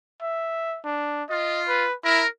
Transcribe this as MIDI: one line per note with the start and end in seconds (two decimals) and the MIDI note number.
0.22 0.80 76
0.84 1.24 62
1.29 1.85 65
1.29 1.62 75
1.68 1.94 71
2.04 2.24 64
2.04 2.26 70